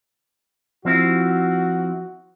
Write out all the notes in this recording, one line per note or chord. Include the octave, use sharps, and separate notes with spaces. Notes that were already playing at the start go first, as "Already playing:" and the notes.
F3 C4 E4 F#4